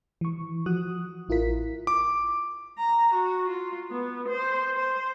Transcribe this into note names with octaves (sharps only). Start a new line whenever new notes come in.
E3 C#6
F3 F#4 D#6 F#6
A1 E4 F4 A#4 B6
D6
A#5
F#4
F4
B3
C5
C5